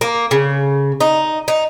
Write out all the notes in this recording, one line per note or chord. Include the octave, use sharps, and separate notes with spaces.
A#3
C#3
D#4
D#4